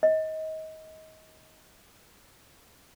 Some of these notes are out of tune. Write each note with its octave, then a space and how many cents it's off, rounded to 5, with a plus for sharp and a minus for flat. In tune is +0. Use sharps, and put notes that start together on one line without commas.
D#5 +25